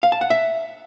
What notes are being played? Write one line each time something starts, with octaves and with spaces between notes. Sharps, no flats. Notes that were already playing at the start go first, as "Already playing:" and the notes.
F5
A5
F#5
E5